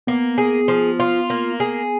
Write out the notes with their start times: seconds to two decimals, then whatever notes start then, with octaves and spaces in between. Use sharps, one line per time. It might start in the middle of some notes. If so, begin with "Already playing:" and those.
0.07 A#3 B3
0.38 G#4
0.68 F3
1.00 F4
1.30 A#3
1.60 G#4